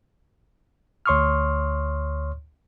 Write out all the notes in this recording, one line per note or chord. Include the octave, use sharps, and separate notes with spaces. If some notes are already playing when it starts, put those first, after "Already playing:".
D2 C#5 C6 C#6 D#6 F6